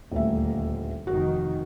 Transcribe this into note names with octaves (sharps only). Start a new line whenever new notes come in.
D#1 A1 D2 A#3 E5
F1 D#3 F#4